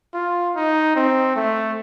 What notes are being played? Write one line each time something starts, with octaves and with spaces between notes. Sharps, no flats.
F4
D#4
C4
A3